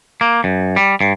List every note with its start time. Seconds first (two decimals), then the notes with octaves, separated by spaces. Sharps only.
0.21 A#3
0.44 F#2
0.76 G3
1.01 G2